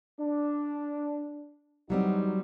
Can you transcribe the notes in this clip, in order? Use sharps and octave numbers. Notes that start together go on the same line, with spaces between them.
D4
E2 F#3 G3 C4 D#4 F#4